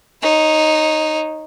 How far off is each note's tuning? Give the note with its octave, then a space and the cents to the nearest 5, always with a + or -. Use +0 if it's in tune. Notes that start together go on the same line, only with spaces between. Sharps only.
D#4 +0 C#5 -25